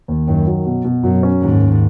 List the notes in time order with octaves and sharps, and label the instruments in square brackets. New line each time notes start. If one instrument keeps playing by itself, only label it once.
[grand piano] D#2
[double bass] F#2 [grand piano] D#3
[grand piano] F#3
B2
B2
[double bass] F#2 [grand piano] F#3
[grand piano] C#4
[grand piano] D#2 [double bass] G#2
[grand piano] D#2